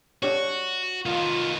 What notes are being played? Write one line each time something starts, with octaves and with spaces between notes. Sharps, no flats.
D4 F#4 G4 C#5
D#3 B3 F4